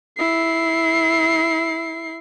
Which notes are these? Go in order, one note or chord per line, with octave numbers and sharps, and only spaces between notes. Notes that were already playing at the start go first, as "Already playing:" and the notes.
E4 C7